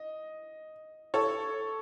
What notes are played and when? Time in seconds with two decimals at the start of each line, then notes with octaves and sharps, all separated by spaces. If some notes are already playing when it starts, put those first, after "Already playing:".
Already playing: D#5
1.14 A4 C#5